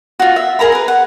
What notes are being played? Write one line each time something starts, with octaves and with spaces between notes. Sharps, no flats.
F4 F#4
E5
G#4 A#4 A#5 B5
A#4 B4
F#5